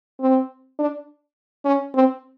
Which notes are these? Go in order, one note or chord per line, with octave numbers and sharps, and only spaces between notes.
C4
D4
C#4
C4